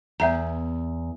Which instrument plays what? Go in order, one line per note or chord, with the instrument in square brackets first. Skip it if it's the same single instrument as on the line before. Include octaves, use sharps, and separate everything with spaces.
[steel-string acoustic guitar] E2 [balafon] B3 E5 A#5